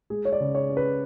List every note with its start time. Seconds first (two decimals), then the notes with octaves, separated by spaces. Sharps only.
0.10 G#3 G#4
0.25 C#5
0.32 D5
0.40 C#3
0.55 C#5
0.69 C#4
0.77 B4